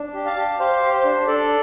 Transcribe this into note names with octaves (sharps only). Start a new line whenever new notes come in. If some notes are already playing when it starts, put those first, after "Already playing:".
Already playing: D4
G4
F5 A5
G4
G4 C5 F5
G4
C5
D4
D4 A4 D5